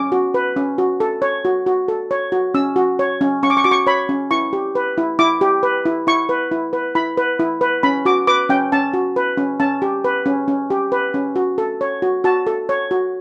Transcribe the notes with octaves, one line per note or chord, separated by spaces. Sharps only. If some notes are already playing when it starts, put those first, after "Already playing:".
Already playing: C#4 D6
F#4
B4
C#4
F#4
A4
C#5
F#4
F#4
A4
C#5
F#4
C#4 E6
F#4
C#5
C#4
C#4 C#6
D6
C#6
F#4 D6
C#6
C#5 B5
C#4
E4 C#6
G4
B4
E4
E4 D6
G4
B4
E4
E4 C#6
B4
E4
B4
E4 B5
B4
E4
B4
C#4 B5
F#4 D6
B4 D6
C#4 G5
C#4 A5
F#4
B4
C#4
C#4 A5
G4
B4
C#4
C#4
G4
B4
C#4
F#4
A4
C#5
F#4
F#4 A5
A4
C#5
F#4